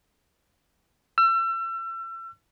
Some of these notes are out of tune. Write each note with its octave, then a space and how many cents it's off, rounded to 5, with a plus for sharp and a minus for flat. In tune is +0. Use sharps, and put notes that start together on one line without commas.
E6 +35